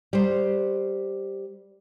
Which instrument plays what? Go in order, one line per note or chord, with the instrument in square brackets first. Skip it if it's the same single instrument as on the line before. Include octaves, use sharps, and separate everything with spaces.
[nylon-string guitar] G3 C5